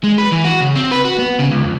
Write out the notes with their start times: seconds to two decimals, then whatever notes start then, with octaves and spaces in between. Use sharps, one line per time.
0.04 G#3
0.18 B4
0.32 E3
0.44 F#4
0.60 C#3
0.75 C4
0.91 B4
1.05 F#4
1.19 B3
1.40 C#3
1.51 C#2
1.64 F2